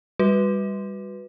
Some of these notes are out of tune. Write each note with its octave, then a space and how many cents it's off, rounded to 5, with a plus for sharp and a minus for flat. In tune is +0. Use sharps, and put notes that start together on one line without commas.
G3 +25 F#4 -10 B4 +0